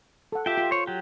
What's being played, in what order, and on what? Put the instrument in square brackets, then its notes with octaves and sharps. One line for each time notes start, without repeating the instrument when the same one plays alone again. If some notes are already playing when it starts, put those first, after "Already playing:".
[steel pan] A4 F#5
[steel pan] F4 [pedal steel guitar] G4 E5 G5
[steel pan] F4
[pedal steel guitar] C5 C#5
F#3 G4